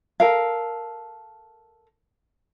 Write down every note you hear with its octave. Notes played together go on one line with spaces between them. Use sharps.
A4 A#4 F5